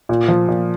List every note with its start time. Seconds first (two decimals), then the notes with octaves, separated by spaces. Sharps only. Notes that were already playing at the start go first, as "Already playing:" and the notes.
0.09 A#2
0.28 F3
0.48 A#2